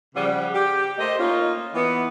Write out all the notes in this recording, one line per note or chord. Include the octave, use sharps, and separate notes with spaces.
C#3 F3 G3 G#4 F#5
G4
A3 A#3 C5 D#5
A#3 C#4 D#4 F4
E3 B3